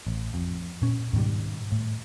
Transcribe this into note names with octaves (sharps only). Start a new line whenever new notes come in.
A1
F2
A#2 C#4
G#2 B2 D#3 G3
A2